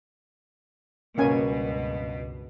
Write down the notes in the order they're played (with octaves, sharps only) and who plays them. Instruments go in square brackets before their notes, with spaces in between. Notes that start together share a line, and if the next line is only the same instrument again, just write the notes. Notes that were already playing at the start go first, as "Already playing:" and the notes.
[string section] C#2 G2 B2 [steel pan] A#3 C#4 G#5